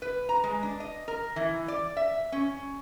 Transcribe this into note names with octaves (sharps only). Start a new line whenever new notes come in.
B4
A#5
G#3
D4
D#5
A#4
E3
D5
E5
C#4